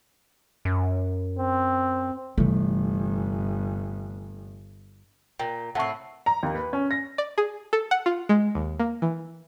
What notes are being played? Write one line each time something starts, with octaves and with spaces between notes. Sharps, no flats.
F#2
C4
G1 C3 E3 G3 A3
A#2 G5
A2 C4 F#5 A5 C#6
A#5
D#2
B4
C#4
A#6
D5
G#4
A4
F#5
F4
G#3
D#2
A#3
E3